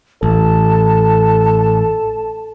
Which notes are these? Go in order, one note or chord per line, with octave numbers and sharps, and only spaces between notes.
A1 A4 A5